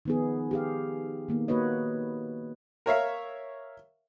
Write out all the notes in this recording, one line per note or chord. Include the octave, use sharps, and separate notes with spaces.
D#3 F3 B3 D#4 G#4
G4 G#4 F5
D#3 A#3 B3
A#3 F#4 B4 C#5 D#5
A#4 C#5 E5 F5